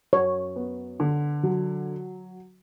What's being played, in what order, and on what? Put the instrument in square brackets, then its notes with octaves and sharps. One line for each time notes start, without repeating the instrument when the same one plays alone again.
[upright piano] F#2 [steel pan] C#5
[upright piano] B3
D3
F#3